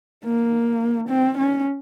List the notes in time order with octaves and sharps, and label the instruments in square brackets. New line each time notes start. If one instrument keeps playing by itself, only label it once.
[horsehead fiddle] A#3
C4
C#4